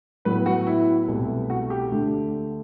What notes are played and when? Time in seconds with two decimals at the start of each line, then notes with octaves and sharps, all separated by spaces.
0.25 A2 F#3 B3 B4
0.46 F#4
0.67 E4
1.08 C2 B2 A3
1.50 F#4
1.70 G4
1.91 D2 D3 A3